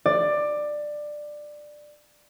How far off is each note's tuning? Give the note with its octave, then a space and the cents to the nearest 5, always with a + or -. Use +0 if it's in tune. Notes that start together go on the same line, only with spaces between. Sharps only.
D5 +15